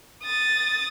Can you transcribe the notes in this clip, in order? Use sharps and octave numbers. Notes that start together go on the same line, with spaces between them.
D#6 A6